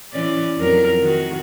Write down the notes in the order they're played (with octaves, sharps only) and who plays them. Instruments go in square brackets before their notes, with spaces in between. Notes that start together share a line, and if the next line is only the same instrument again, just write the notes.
[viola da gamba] E3 C#4 D5
F2 F#3 A#4
D#3 F#4